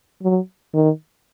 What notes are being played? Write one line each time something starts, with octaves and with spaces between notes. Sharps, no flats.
F#3
D#3